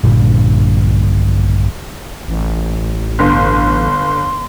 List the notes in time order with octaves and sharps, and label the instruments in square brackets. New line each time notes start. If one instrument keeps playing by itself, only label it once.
[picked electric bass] A#1 G2 A#2 D3
[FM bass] A1
[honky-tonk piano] G1 [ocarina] C6